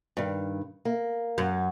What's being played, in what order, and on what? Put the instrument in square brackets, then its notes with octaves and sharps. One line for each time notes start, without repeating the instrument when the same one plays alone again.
[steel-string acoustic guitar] G2 D#3
A#3
[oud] F#2